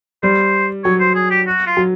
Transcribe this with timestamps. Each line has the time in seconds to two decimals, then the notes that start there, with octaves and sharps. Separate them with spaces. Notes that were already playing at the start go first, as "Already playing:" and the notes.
0.23 G3 C5
0.84 F#3 C#5
1.00 C5
1.15 G#4
1.30 G4
1.47 F#4
1.66 F4
1.77 F#3